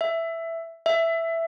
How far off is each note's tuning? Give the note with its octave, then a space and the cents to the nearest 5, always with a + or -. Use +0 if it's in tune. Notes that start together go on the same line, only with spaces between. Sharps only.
E5 +5
E5 +5